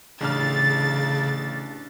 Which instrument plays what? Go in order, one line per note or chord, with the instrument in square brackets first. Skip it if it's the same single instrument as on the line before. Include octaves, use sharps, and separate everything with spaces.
[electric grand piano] A1 D4 F6 [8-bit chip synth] C#3 [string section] A6